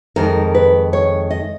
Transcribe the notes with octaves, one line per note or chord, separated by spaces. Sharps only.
F2 D#3 G#3 A#4
B4
C#5
D#5